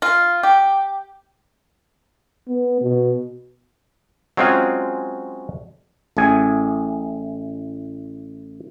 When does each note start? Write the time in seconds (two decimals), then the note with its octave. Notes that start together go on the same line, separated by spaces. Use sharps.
0.02 F4
0.43 G4
2.48 B3
2.82 B2
4.37 F#3 G#3 C4 C#4 F4 G#4
6.17 A1 A2 G#4 G#5